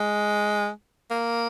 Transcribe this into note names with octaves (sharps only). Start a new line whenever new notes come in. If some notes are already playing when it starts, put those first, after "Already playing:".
Already playing: G#3
A#3